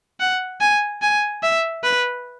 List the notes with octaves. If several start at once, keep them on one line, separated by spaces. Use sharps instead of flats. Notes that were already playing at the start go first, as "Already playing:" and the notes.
F#5
G#5
G#5
E5
B4